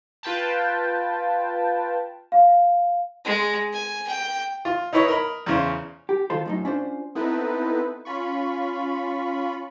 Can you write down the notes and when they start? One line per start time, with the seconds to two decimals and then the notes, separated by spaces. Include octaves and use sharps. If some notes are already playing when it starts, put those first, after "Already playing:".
0.23 F4 B4 G5 A5
2.32 F5
3.25 G#3
3.73 G#5
4.08 G5
4.65 F4
4.93 D#4 E4 B4 C#5 D#5
5.08 A#4 D#5 B5
5.46 E2 C#3 C5
6.09 G4
6.30 D#3 F4 A4 C5
6.46 F#2 A2 D#4
6.65 C#4 D4 F4 C5
7.15 B3 C4 D#4 E4 A4 B4
8.05 C#4 F4 B5 C#6